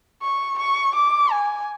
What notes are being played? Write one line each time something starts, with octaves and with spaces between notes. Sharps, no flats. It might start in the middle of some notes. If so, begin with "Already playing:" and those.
C#6
C#6
D6
G#5